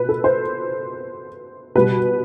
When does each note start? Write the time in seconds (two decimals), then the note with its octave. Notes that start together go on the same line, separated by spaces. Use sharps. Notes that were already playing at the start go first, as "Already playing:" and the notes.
Already playing: B2 B4
0.09 A4
0.24 C5
1.75 B2 G3 B4